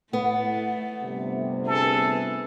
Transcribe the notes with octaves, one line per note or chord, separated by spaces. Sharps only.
A2 A3 B3 F#5
G1 C3
G#4 A4 B4